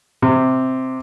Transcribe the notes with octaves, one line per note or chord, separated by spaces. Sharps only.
C3